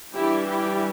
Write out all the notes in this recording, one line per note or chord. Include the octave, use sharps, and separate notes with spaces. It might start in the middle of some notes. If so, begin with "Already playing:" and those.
E3 G3 D4 E4 G4
E4 G4